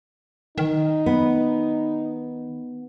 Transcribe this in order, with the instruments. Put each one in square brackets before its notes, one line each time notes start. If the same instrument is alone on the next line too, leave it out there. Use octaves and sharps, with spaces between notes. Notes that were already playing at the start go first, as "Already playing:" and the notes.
[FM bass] D#3 [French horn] D#4
[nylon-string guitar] B3